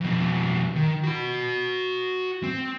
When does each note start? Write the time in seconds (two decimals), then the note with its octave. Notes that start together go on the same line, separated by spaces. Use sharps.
0.01 F2 B2
0.75 D#3
1.04 F#4 B5
2.43 C4